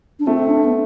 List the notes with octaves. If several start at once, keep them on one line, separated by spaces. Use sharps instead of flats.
D4
A3 C4
D4
B3